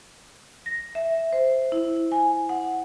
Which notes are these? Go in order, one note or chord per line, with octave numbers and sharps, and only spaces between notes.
A#6
E5
C5
E4
G#5
F#5